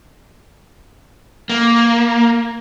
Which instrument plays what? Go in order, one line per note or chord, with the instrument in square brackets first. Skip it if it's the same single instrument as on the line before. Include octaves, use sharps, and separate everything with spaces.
[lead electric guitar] A#3